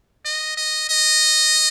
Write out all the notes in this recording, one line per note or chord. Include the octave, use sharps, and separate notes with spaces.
D#5
D#5
D#5